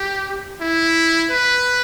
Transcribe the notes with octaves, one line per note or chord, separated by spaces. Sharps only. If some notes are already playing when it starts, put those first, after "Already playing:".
Already playing: G4
E4
B4